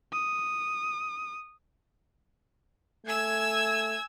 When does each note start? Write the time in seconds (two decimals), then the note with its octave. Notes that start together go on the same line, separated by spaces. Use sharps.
0.13 D#6
3.06 A3 G#5 E6 G#6